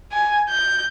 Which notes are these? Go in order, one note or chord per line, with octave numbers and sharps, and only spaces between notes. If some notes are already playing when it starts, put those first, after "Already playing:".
G#5
G6